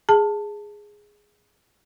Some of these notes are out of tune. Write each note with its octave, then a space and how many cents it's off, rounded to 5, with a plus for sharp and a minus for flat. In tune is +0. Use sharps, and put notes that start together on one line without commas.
G#4 +0 A5 +10